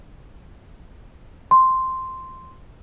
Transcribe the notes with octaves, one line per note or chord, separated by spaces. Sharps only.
C6